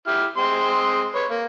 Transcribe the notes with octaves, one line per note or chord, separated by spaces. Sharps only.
E4 G4 F6
G#3 C4 C6
B4 C#5
A#3